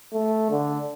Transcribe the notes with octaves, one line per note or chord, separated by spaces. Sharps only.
A3
D3